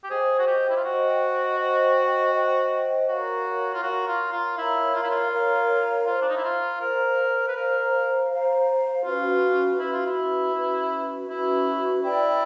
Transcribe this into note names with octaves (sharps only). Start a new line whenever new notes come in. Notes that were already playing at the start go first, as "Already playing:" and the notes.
G4
G#4 C5 D#5 G5
F#4
G4
E4
F4
F#4 C5 D#5 G5
C5 D#5 G5
C5 D#5 G5
F#4 A#4 C#5 F5 A#5
F4
F#4 A#4 C#5 F5 A#5
F4
F4
E4 A#4 C#5 F5 A#5
F4
E4
F4
A#4 C#5 F5 A#5
F4 C5 F5 A#5
D4
D#4
E4
F4
A#4 C5 F5 A#5
B4
A#4 C5 F5 A#5
C5 F5 A#5
C#4 F4 F#4 B4
C#4 E4 F#4 B4
F4
E4
C#4 F#4 B4
C#4 E4 F#4 B4
E4 B4 D5 G5